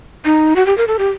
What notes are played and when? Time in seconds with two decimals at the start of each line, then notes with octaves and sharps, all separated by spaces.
0.25 D#4
0.56 F#4
0.66 G4
0.78 A#4
0.87 A4
0.99 G4